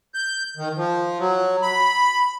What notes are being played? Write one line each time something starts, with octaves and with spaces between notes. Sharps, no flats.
G6
D#3
F3
F#3
B5